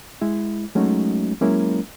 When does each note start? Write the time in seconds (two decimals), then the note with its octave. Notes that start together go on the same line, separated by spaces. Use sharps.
0.22 G#3 E4
0.75 F#3 G#3 A3 C#4 D#4 F#4
1.41 F#3 G#3 A#3 C#4 E4 A#4